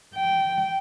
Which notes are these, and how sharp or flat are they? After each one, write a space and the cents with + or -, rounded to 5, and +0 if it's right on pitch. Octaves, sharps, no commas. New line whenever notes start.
G5 -10